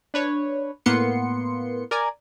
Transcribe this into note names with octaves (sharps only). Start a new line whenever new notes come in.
D4 B4 C#5
A2 A#3 B3 C6 C#7
A#4 D5 G#5 A#5 G#6